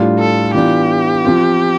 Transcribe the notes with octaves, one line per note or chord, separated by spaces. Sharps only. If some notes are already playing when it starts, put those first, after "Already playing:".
Already playing: A2 G3 D4 F4
A4
E3 B3 D4 F4 G4
F3 C4 F4